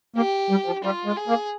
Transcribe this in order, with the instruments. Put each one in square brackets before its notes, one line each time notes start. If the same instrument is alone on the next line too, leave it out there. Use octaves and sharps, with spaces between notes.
[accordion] A#3 [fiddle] G4
[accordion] G3
F3
[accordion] G3 [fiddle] F4
[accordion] G#3
[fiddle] G#4
[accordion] A#3